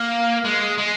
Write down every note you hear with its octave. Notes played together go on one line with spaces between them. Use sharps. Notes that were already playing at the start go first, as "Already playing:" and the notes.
Already playing: A#3
G#3
G#3